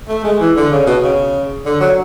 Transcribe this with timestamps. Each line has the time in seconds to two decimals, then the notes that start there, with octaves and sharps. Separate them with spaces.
0.08 A3
0.24 G#3
0.40 E3
0.56 D3
0.72 C#3
0.86 B2
1.03 C#3
1.66 D3
1.80 F#3